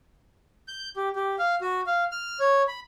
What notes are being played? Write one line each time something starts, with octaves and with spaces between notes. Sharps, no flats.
G6
G4
G4
F5
F#4
F5
F6
C#5
B5